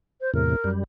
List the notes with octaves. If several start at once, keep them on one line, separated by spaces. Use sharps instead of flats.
C5
E2 A2 C3 A#4
F#2 G3